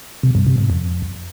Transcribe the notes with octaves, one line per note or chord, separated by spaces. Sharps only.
C3
G2
C3
G#2
F2